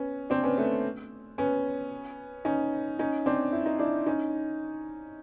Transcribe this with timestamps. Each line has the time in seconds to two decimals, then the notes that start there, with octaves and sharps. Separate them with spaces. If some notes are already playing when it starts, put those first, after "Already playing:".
Already playing: B3 C#4
0.30 C4 D4
0.44 B3 C#4
0.57 A3 B3
1.38 B3 C#4
2.45 C#4 D#4
2.99 C#4 D#4
3.26 C4 D4
3.52 E4
3.66 D#4
3.79 D4 E4
4.06 C#4 D#4